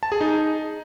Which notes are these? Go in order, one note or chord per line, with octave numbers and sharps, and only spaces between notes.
A5
G#4
D#4